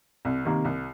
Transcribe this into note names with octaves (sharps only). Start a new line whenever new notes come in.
C2
C3 D#3 A#3
C2